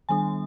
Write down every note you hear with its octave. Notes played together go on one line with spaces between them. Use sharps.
D#3 G3 B3 D4 G#5